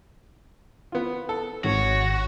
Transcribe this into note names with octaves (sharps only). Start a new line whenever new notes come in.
B3 F4
A4
G#1 F#4 C#5